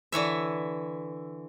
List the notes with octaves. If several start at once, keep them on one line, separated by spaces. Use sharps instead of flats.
D3 E3 C#5 E5